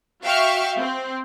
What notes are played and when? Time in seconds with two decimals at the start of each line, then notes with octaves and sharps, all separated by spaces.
0.23 F#4 E5 F5 G5 C#6 F6
0.78 C4